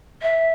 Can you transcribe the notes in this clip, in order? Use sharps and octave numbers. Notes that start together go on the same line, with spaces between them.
E5